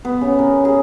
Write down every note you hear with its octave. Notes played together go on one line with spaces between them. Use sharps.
B3
C#3
A#4
G#4